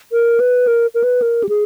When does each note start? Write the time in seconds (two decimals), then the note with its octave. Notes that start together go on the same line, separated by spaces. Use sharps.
0.12 A#4
0.40 B4
0.67 A#4
0.95 A#4
1.03 B4
1.22 A#4
1.44 G4
1.49 G#4